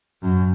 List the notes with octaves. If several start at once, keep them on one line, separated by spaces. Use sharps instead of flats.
F#2